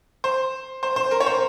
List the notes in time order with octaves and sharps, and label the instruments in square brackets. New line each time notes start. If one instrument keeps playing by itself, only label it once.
[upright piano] C5
C5
C5
A#4
C#5
C5